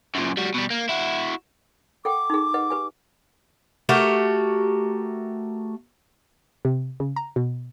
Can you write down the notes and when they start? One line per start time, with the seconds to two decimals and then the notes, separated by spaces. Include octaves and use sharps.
0.15 F#2 A#2
0.37 G3 F#4
0.54 B2 G3
0.70 A#3
0.89 E4 F#4
2.05 A4 F#5 G5 D6
2.30 D#4 G#4
2.54 B4 D#5 F#5
2.70 G4 B4 G#5
3.89 A3 F#4 G4 A#4
6.65 C3
7.00 C#3
7.16 A#5
7.36 B2